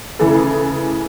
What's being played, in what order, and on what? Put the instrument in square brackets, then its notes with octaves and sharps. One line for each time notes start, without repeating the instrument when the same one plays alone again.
[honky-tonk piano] C#3 E3 A3 G#4 A4 B4